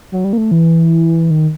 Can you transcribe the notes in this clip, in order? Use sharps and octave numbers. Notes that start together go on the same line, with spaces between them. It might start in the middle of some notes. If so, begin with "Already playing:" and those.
F#3
G3
A#3
A3
E3
D#3